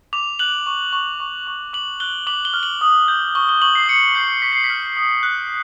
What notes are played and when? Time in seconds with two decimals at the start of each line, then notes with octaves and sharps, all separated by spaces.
0.13 D6 F7
0.39 F#6 F#7
0.66 C#6
0.93 C#6
1.20 C#6
1.47 C#6
1.73 D6 F#7
2.00 F#6 G7
2.27 D6 F#7
2.45 G7
2.54 F6
2.63 F#7
2.81 D#6
3.08 G6
3.35 C#6 G7
3.49 G7
3.62 C#6 F#7
3.75 C7
3.88 D#6 C#7
4.15 G6 C7
4.42 C#6 B6
4.52 C7
4.64 B6
4.70 F6
4.97 D#6
5.23 F#6